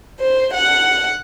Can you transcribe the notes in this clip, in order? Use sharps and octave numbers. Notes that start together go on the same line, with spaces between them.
C5
F#5